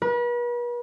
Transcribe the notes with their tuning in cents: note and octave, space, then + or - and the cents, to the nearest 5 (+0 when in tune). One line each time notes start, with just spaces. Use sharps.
B4 -40